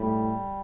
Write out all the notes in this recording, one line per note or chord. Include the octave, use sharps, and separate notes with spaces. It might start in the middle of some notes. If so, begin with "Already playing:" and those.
Already playing: A2 G3